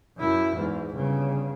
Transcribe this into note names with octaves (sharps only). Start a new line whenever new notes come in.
F#2 E4
E2 G#2
G1 C#3